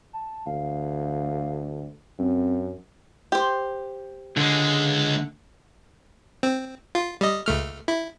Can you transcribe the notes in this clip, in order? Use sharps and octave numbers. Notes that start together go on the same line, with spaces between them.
A5
D2 F5
F#2 C4
G4 C5
C#2 D3 G#3
C4
F4
G3 D#5
C#2 A3 F6
E4